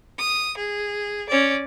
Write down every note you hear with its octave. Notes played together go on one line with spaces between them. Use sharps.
D#6
G#4
C#4 D5